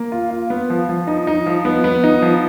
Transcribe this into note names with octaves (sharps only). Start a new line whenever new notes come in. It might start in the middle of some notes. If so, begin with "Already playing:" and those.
Already playing: A#3
F4
F4
B3
F3
F3
D#4
D#4
F3
B3
B3
D#4
F3